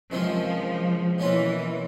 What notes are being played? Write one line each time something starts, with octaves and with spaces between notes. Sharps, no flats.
C#2 C3 D#3 F3 G#3 C4
B2 E3 F#3 A#3 C#4 F4